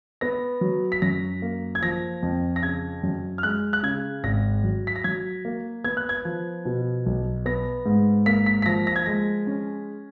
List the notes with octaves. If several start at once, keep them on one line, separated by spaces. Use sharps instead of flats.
B3 A#6
F#3
B6
F#2 A#6
A#3
G#6
F3 A#6
F2
A#6
C#3 G#6
F#2
F6
G#3 F#6
F#6
C#3 G#6
G#1 A#6
F#3
B6
A#6
F#3 G#6
A#3
B3 G#6
F#6
G#6
F3
B2
B1
B3 A#6
G#2
A#3 B6
B6
B6
F3 A#6
A#6
G#6
G#3 A#6
C#4